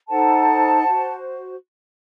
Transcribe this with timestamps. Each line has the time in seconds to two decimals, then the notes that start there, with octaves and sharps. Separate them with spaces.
0.08 D#4 A4 C5 F#5 A5
0.83 F#4 C5